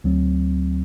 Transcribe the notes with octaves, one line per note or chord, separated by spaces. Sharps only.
D2 F#3 C4